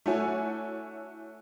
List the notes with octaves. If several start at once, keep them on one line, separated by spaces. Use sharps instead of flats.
A3 D4 E4 F#4 C#5 G#5